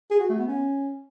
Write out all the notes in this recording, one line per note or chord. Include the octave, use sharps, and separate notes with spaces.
G#4
F#4
A3
B3
C#4